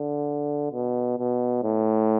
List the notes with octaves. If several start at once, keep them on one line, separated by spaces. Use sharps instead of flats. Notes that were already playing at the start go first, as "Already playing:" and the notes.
Already playing: D3
B2
B2
A2